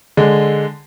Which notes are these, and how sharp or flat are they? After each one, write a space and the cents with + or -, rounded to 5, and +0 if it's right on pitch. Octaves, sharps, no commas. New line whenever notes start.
D3 +0 G#3 +0